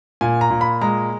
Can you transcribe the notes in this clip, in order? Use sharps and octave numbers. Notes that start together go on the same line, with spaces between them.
A#2 G#5
A#5
A#2
B5
G#3 A#5